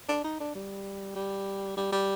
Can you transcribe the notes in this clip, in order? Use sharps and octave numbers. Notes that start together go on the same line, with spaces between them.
D4
D#4
D4
G3
G3
G3
G3